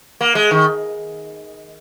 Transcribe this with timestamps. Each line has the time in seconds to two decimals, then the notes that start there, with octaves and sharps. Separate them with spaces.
0.21 A#3
0.35 G#3
0.51 D#3